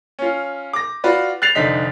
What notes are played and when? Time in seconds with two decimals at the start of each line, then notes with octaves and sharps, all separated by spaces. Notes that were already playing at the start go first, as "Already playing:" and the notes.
0.19 C#4 F4
0.73 D6 A#6
1.04 F4 F#4 B4 D5
1.42 F#6 A6 C7 F7
1.55 F1 D3 D#4 B6